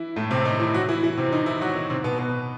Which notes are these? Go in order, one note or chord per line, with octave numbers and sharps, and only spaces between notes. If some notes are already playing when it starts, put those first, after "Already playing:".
Already playing: E3 E4
A2 A3
C3 C4
D#3 D#4
E3 E4
F#3 F#4
E3 E4
E3 E4
C3 C4
D#3 D#4
E3 E4
F#3 F#4
D#3 D#4
C3 C4
B2 B3
B2 B3